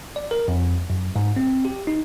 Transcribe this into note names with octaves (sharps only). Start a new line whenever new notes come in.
D5
A#4
F2
F#2
G#2
C4
G4
D#4